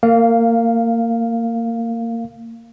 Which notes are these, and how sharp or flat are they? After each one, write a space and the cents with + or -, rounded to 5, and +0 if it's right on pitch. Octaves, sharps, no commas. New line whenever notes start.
A#3 -25 F5 +0